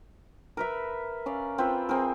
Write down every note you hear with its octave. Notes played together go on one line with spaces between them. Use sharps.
A#4 B4 E5
C#4 D5 F5
C4 F4 B4
C4 G#4 A#4